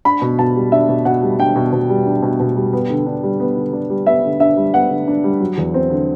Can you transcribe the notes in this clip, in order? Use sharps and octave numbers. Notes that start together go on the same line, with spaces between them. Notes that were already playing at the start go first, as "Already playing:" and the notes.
D4 B5
B2
B2 A5
G3
D4 E5
B2
B2 F#5
G3
D4 G5
B2
B2
G3
D4
B2
B2
G3
B3
D3
D4
G3
B3
D3
D4
G3
B3 E5
D3
D4 E5
G3
B3 F#5
D3
D4
G3
F#3
E2
C4
D3